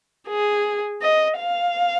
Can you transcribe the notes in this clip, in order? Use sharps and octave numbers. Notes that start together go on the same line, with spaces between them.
G#4
D#5
F5